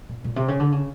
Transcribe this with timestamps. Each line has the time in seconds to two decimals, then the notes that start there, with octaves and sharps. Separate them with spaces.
0.09 A#2
0.24 A#2
0.36 C3
0.48 C#3
0.60 D3
0.72 C#3